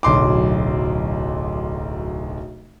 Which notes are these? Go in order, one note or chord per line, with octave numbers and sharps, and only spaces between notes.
D1 B1 C6 D6